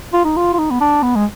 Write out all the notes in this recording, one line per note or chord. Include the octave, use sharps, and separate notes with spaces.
F4
D#4
F4
F4
D#4
B3
D4
B3
G#3